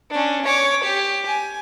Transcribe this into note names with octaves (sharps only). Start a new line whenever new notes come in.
C#4 D4
C#5 D6
G4
G#5